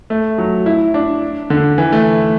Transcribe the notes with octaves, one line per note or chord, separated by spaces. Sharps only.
A3
F#3
E4
D4
D3
E3
A3